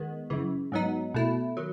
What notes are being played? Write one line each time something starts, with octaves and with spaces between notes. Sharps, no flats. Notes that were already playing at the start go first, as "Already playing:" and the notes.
Already playing: D#3 G#3 B3
F#2 C#3 E3
G#2 F#3 B3 D#4
B2 A3 E4
D#3 F#3